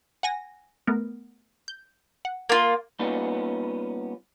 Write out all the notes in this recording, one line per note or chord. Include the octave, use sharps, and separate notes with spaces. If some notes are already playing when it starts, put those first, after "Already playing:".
F#5 G#5 A#6
A3 B3 A#4
G6
F#5
A#3 F4
G3 A#3 B3 C#4 D#4 F4